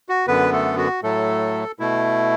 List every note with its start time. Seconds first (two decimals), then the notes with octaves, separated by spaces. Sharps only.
0.09 F#4
0.27 F#2 D3 B3 B4
0.52 A3 A4
0.78 F#4
1.03 A2 F#3 A3 A4
1.79 B2 A3 E4